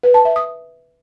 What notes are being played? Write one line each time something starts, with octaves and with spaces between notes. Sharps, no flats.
B4
A5
E5
D#6